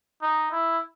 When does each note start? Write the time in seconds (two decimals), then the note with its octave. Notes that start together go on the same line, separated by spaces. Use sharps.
0.22 D#4
0.52 E4